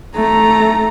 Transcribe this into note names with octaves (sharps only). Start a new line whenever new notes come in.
A3 A#5